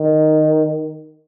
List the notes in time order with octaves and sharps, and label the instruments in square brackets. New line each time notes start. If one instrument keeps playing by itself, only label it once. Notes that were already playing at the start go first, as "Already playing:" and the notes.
Already playing: [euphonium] D#3